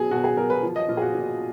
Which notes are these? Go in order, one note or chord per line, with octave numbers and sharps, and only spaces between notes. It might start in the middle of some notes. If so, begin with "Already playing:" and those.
Already playing: B2 F#3 G#4
B2 F#4
G#4
F#3 A#4
B4
F3
D#5
A#2 F4
G#4
F#4
A#2